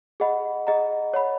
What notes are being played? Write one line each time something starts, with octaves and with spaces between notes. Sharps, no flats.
G#4 D#5 F#5 B5
G#4 D#5 F#5 A#5
C#5 F#5 B5